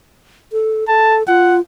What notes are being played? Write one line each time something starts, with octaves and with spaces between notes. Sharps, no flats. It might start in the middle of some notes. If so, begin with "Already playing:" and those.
A4
A4 A5
F4 F#5